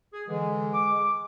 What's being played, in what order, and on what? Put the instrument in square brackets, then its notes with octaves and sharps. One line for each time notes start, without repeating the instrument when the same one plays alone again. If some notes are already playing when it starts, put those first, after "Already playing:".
[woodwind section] G#4
[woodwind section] D3 E3 [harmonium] G#3
[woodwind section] D6